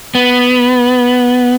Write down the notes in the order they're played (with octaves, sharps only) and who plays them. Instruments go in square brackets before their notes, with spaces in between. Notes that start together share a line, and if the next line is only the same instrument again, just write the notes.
[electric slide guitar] B3